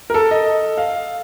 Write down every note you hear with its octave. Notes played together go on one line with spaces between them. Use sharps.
A#4
A4
D#5
F5